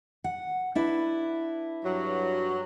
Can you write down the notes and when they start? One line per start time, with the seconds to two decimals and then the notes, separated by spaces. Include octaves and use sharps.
0.24 F#5
0.75 D4 E4 B4
1.84 G2 F#3